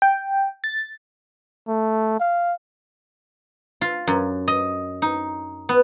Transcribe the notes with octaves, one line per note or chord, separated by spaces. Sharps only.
G5
A6
A3
F5
F4
F#2
D#5
D#4
B3